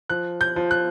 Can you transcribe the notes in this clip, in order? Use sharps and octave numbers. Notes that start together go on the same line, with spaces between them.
F3 F#6
G6
F3
F#6